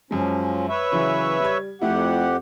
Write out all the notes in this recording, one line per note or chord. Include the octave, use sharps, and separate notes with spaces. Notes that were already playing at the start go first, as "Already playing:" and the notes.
F#2 F3 G#3 C#4
B4 C#5 E5
C#3 E3 F#3
G3 G#6
F2 F3 A3 E4 G4 F#5